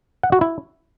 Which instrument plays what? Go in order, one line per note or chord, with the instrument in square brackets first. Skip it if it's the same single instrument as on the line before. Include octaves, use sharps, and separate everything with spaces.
[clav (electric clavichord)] F#5
F#4
E4